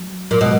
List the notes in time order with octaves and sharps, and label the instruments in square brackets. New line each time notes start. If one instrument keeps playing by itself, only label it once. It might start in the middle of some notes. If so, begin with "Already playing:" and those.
Already playing: [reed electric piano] F#3
[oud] A#2 [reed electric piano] F#3
[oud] B2 [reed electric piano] G#3